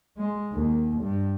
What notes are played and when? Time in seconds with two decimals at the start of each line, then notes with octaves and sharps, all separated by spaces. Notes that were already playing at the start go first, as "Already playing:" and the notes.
0.17 G#3
0.52 D#2
1.01 G2